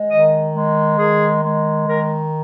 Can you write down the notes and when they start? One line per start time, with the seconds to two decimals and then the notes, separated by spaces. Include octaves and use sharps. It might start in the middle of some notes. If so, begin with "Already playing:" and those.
Already playing: G#3
0.09 D#3 D#5
0.53 G#3
0.98 D#3 G#4
1.42 G#3
1.87 D#3 A#4